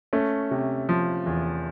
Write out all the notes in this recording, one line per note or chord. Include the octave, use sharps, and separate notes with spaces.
A3 C#4
C3
F3
E2